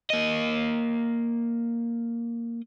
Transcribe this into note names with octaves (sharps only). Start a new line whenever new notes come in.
A#3 D#5